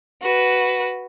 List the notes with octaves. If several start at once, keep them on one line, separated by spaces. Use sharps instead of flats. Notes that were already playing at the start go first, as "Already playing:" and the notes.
F#4 B4